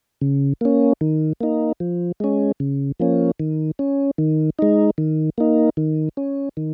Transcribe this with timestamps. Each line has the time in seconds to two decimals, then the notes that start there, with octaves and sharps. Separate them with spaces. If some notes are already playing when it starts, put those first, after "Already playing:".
0.21 C#3
0.61 A#3 C#4
1.01 D#3
1.41 A#3 D#4
1.80 F3
2.20 G#3 C#4
2.60 C#3
3.00 F3 A#3 C#4
3.40 D#3
3.79 C#4
4.18 D#3
4.59 G#3 D#4
4.98 D#3
5.38 A#3 D#4
5.77 D#3
6.17 C#4
6.57 D#3